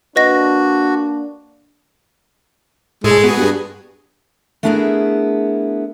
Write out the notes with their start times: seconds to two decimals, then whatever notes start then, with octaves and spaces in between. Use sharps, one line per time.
0.16 A#3 D4 F#4 B4 D#5 A#6
3.04 A2 G#3 G#4 A4
3.24 B3 F#4 G#4
3.38 G2
4.63 A3 B3 D4 E4 G#4 A#4